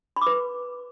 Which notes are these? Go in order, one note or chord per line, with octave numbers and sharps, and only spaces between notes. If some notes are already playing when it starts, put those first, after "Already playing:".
B5
D6
B4